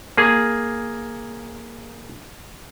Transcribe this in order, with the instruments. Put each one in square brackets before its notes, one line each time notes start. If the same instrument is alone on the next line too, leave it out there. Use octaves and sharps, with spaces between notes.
[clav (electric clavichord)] A#3 G#4